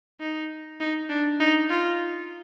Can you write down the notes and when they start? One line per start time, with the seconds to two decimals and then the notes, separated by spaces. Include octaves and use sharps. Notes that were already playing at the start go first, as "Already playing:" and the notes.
0.20 D#4
0.80 D#4
1.09 D4
1.40 D#4
1.70 F4